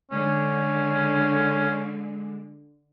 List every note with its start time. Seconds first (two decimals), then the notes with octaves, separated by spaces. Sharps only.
0.12 D3 G#3 C#4